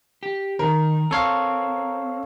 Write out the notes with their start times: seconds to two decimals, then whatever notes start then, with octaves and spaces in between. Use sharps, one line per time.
0.23 G4
0.59 D#3 A#4
1.11 C4 A4 C#5 F5